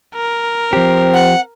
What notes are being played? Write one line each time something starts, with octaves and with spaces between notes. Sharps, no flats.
A#4
F3 C4 G4
F#5